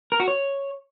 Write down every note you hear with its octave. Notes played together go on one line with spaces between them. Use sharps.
A#4
F#4
C#5